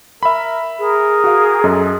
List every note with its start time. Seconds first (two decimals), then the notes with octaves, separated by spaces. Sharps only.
0.23 A#4 E5 B5
0.79 G#4 A#4
1.24 F#4 F5
1.64 F#2 A4 D#5